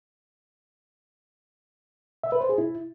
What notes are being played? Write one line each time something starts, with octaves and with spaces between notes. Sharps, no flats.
E5
B4
C5
G#4
E4